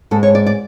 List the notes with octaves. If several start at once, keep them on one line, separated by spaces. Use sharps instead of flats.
G#2 G#3 A4
C#5
D5
D5